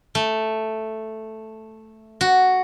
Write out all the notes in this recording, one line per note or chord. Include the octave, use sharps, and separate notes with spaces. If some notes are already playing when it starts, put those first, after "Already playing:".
A3
F#4